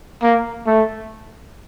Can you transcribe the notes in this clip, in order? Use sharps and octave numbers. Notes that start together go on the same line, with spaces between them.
A#3
A3